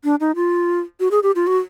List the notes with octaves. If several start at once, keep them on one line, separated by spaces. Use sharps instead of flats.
D4
D#4
F4
F#4
G#4
G4
F4
F#4